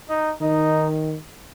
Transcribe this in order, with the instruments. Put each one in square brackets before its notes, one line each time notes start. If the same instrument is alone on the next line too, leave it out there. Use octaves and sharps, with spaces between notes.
[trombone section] D#4
[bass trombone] D#3 [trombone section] D#4